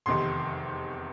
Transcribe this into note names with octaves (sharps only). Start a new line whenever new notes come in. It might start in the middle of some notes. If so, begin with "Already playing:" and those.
F1 E2 C3 D#3 C6